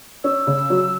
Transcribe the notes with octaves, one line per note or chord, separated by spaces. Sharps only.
C#4 E6
C#3
F#3